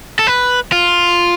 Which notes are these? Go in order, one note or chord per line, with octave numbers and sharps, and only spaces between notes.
A4
B4
F4